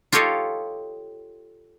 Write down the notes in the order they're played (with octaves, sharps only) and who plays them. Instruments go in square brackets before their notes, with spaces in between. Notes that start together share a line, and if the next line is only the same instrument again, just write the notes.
[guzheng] F4 G4 A4 C#5 D#5 F5